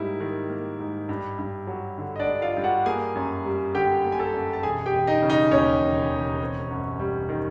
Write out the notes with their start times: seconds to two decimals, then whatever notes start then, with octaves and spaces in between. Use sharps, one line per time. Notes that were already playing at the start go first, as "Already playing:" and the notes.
Already playing: G#2 G3 A#3 E4
0.20 D#3
0.50 A#3
0.79 G#2
1.09 G2
1.39 G2
1.67 F#3
1.98 D3
2.16 D#5
2.19 D4 D5
2.27 G2
2.42 F4 F5
2.57 G2
2.64 F#4 F#5
2.86 A#3 G#4 G#5
3.15 F#2
3.45 G3
3.75 D3 G4 G5
4.05 A#3
4.12 G#5
4.19 A4 A5
4.34 F#2
4.53 A5
4.63 E1 G#4 G#5
4.86 G4 G5
4.93 E1
5.07 D#4 D#5
5.22 C#3
5.30 D#4 D#5
5.51 D#2 C#4 C#5
5.82 E1
6.11 E1
6.41 C4
6.71 F#2
6.99 G3
7.29 D#3